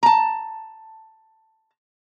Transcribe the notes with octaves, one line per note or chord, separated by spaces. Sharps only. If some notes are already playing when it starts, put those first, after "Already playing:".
A5 A#5